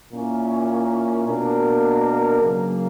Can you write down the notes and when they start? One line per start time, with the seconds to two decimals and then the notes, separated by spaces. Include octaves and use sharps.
0.11 A#2 A#3 C#4 E4 A#4
1.26 B2 A#3 D4 A#4
2.40 C#3 F#3 A#3